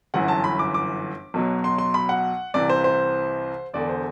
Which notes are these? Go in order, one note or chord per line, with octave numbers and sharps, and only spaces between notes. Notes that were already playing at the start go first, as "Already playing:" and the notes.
G1 F#2 E3 F#5
A5
B5
D6
D6
B1 B2 F#3
C6
C6
B5
F#5
C2 C3 E3 D5
C5
C5
E1 E2 D3 D5
C5